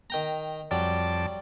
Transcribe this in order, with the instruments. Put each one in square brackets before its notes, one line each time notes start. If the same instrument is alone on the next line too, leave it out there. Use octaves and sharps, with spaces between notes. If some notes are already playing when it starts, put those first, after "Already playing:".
[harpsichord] D#3 G5 A#5
[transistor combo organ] F2 A5 D6 [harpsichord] F#3 G3